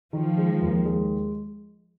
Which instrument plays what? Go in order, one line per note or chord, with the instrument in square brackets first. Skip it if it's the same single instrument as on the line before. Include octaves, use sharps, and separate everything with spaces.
[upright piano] D#3 [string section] F3
[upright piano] G#3
D#2
G#3